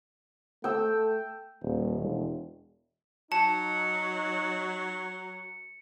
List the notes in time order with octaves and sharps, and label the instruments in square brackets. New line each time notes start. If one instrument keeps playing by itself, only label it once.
[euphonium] A3 [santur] G5 E6
[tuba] D#1
E1
[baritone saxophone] F#3 [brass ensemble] D#4 [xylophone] A5 [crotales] C#7